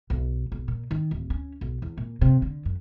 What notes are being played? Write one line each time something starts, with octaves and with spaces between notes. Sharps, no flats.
B1
B1
A#2
D#3
D1
C#4
B1
E2
A#2
C3
D3
F#2